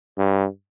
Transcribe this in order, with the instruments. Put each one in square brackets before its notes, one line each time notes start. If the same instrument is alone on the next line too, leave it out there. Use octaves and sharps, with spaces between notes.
[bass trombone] G2